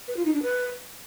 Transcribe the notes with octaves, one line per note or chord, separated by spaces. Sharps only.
B4
F4
D#4
D4
B4